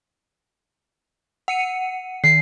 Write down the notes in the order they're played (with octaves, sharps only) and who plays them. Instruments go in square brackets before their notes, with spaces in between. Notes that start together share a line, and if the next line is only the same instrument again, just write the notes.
[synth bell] F#5 C#7 D#7
[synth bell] D#3 [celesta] C7